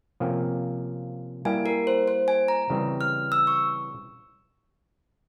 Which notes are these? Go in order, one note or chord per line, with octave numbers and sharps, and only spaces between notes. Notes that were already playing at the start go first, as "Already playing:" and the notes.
C3 F3 A#3 C#4 G4
G3 A#3 E4 G4 G#5
A#4
C5
C5
G#5
A#5
C#3 E3 G3 C4
F6
E6
C#6